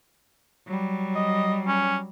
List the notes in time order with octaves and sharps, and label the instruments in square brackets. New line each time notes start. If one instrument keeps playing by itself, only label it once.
[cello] F#3 G3
[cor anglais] D#5
C#4